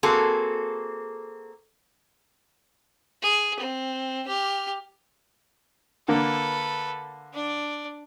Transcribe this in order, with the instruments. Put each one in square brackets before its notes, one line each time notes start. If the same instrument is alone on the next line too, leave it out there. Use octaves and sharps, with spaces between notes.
[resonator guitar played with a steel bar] A#3 C4 F#4 G#4 A4
[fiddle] G#4
C4
G4 F6
[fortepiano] D3 A#3 [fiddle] A4 B4
[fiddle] D4 D5